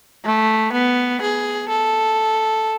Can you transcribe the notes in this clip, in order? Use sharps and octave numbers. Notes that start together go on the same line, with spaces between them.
A3
B3
G#4
A4